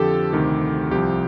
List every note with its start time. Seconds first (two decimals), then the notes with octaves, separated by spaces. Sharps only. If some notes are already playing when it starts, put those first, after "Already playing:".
Already playing: F2 D3 F3 G4 A4
0.33 D2 C3 D#3
0.91 C2 C3 F3 G4